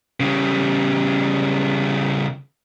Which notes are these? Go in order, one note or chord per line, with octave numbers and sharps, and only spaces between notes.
C#3 G3